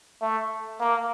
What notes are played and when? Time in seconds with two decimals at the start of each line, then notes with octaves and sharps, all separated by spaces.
0.22 A3
0.80 A#3